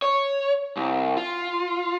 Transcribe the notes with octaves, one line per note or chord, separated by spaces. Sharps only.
C#5
C2
F4